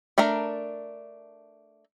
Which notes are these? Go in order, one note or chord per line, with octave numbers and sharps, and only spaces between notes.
A3 D4 A#4 A#5